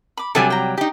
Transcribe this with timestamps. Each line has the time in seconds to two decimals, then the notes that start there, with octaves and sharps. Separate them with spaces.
0.17 B5 D6
0.35 C3 F#3 G3 A4 G#5
0.50 G5 A#5
0.78 D#4 G4